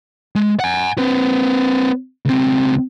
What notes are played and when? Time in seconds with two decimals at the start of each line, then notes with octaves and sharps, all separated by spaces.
0.35 G#3
0.60 F#5 G#5
0.98 C4 B4
2.25 C#2 C4